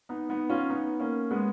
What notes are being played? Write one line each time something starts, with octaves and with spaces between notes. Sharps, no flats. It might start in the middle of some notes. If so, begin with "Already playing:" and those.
B3 D#4
B3 D#4
C#4 F4
B3 D#4
A#3 C#4
G#3 B3